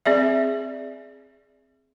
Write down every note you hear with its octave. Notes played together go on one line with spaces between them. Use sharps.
C4 G#4 D5 E5